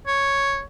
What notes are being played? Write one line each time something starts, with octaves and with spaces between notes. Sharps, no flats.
C#5